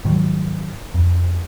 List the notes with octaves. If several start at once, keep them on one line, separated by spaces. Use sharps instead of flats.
G#2 D#3 F3 F#3
F2